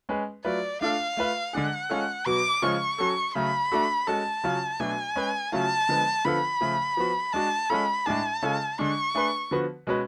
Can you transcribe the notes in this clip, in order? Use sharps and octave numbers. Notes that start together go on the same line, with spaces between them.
G#3 C#4 G#4 B4
F#3 A3 F4 B4 D5
A3 D4 F4 A4 F5
A3 F4 B4
D3 G#3 D4 G#4 F#5
G#3 C#4 F4 A4
B2 F#3 B3 F#4 D6
C#3 F3 G#3 C#4 F4 C#6
F#3 C#4 F#4 A4
C#3 F#3 A3 B5
A3 D4 F#4 A4
G#3 C#4 F#4 A4 A5
C#3 F#3 C#4 F4
B2 F#3 A3 D4 G#5
G#3 C#4 G#4 B4
C#3 F#3 A3 C#4 F4 A5
D3 F3 G#3 B3
D3 F3 B3 F4 A4 B5
C#3 F3 A3
F3 B3 F#4
G#3 D4 F#4 A5
G#3 C#4 F4 A4 B5
A2 G#3 D4 G#4 A5
C#3 G#3 C#4 F4 A4
D3 G#3 D4 C#6
A3 D4 G#4 B4
D3 F3 B3 F#4 B4
B2 G#3 C#4 F#4 B4